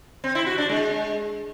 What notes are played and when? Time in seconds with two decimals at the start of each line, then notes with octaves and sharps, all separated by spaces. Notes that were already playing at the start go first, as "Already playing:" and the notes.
0.24 C4
0.35 E4
0.47 F#4
0.58 D4
0.69 G#3